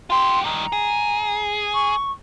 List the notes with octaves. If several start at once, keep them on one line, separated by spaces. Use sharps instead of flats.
F4 G4 C6
G2 D#3 A#5
G#4
C#6